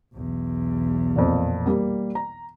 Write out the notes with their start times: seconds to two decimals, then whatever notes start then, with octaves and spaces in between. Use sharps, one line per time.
0.14 B1 E2
1.16 F2 A#2
1.66 G3 A#3
2.15 A#5